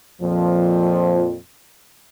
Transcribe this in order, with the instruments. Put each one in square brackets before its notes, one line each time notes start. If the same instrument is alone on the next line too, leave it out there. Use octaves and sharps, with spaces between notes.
[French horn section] F2 A#2 F3